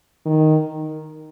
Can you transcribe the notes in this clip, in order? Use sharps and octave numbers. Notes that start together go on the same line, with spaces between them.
D#3